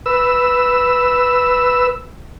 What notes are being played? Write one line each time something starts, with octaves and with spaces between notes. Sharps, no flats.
B4 E6